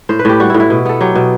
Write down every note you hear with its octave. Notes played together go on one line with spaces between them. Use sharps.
A2 C5
B4
A2 G4
G3 F#4
A2 E4
E4
B2
B3 A4
F#3 G4
B2